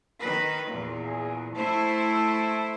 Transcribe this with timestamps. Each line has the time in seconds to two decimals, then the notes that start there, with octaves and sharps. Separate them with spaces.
0.19 D#3 B4
0.67 E2 A#2
1.06 G#4
1.55 A3 E4 C5 A5